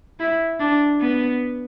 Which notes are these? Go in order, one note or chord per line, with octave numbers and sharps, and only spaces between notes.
E4
D4
B3